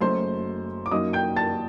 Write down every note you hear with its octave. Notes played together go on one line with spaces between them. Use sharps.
F#1 F#2 F#3 A3 C5 C6
D6
F#2 F#3 A#3 D#4 D#5 D#6
G5 G6
A5 A6